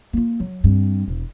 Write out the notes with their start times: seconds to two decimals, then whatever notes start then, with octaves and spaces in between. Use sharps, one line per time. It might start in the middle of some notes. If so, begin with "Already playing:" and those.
0.13 A#3 F4
0.40 F#3
0.64 G2 C4
1.07 E1